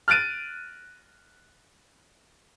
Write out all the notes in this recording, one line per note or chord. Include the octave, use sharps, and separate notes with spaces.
F6 F#6 A6 D7 D#7